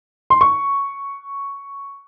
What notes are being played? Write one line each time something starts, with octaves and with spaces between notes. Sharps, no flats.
C6
C#6